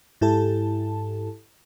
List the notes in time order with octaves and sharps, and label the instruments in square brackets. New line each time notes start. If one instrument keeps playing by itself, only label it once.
[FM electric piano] G#2 E4 G4 A4 A5